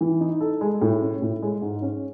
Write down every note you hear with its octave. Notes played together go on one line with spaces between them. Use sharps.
E3
D#4
A4
G#3
A2
C#4
A2
G#3
G#2
C#4